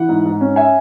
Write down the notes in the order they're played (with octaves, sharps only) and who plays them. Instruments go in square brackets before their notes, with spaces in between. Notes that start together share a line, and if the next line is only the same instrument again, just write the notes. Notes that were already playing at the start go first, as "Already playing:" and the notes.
Already playing: [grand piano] E3 F#5
G#2
G#2
C#4
E5 G#5